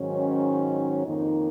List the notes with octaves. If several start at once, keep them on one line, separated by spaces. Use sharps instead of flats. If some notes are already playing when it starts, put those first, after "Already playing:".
Already playing: G#2 D#3 F#3 C#4
F2 D#3 A#3 D#4